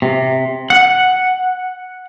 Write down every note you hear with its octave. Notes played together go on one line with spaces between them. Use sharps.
C3
F#5